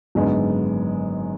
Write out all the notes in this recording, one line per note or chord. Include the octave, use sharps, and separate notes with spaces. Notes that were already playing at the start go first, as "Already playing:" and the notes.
G#1 F#2 D3 G#3 B3